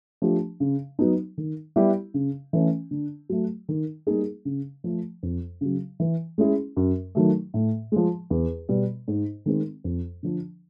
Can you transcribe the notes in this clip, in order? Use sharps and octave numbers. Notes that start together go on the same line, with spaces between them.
F3 A3 D4 G4
C#3
F#3 B3 D#4
D#3
G3 B3 E4 G4
C#3
E3 A3 C#4
D3
F#3 A3
D#3
G3 A#3 D#4 G#4
C#3
F3 A3
F2
C#3 F#3
E3
G#3 C#4 E4 G#4
F#2
D#3 F#3 A3
A2
F3 G#3
E2
B2 G3 B3
G#2
D#3 G#3 C4
F2
D3 F3